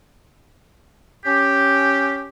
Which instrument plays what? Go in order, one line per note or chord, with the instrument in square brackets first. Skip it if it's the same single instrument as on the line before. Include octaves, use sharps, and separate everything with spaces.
[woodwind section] C#4 G4